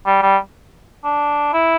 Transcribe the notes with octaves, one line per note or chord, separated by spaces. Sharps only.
G3
G3
D4
E4